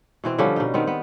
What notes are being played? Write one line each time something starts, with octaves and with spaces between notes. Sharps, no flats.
B2 E3 C4
D3 F3 G3 C#4
B2 D#4
D#3 B3 C4
B3